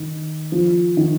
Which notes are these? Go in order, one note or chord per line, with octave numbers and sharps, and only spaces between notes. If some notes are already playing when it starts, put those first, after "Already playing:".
Already playing: D#3
F3
D#3